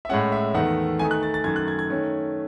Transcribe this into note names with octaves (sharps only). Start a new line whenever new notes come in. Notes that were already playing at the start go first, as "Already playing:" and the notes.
E5
A2 G#3 C#4 F#5
E5
E2 D#3 A3 D#4 F#5
D#3 A3 D#4 G#5
F#6
A6
A6
F#2 D#3 A3 G#6
F#6
G#6
G#6
D#3 A3 C#4